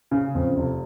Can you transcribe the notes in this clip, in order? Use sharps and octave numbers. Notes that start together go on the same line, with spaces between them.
C#3
F2
F1